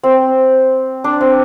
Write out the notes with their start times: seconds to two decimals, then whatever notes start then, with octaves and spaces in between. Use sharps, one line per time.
0.03 C4
1.04 D4
1.21 C4